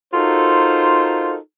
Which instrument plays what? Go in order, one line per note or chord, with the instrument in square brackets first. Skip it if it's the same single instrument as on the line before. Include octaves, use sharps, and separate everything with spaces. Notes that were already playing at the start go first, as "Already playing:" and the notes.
[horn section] D#4 F4 F#4 A4 A#4 C5